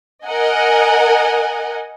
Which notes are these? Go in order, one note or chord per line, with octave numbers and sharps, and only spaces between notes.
A#4 D#5 F#5 G#5